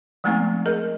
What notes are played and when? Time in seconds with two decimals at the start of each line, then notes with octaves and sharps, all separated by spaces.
0.24 F3 G#3 A3 B3 C4 D#4
0.66 G#4 A#4 D#5